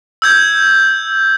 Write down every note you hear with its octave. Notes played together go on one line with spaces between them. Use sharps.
E6 G6 G#6